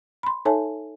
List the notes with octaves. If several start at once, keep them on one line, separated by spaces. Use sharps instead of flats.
B5 C6
D#4 A4 C#5 E5 G#5 A5